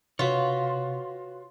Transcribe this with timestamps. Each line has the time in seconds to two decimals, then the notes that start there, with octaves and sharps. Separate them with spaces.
0.19 C3 F4 F#4 B4 C#5